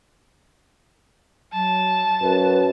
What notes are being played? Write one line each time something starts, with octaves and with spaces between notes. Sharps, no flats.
F#3 A5
F#2 B4